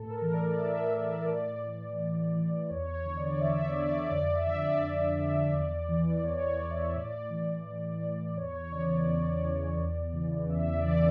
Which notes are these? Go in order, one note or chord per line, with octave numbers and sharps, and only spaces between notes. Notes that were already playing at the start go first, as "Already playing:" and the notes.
Already playing: A2 A4
A#4
E3
D5
A2 E5
E3 D5
A2 D5
E3
A2
E3
E2 C#5
C#5
D3
D5
E2 E5
D5
D3
D5
F2 D5
E5
D3
D5
F2
D3
E2
E3
E2 C#5
D5
E3
E5
A2 D5
E3
A2
E3
E2 C#5
C#5
C#3 E3 D5
D5
E2 D5
C#3 E3
E2
C#3 E3
E2 E5
D5
C#3 E3